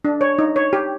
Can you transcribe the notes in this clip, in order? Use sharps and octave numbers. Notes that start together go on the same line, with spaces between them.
D4
C#5
D#4
C#5
G4